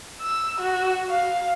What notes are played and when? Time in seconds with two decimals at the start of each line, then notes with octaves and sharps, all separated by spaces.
0.21 E6
0.60 F#4
1.09 F5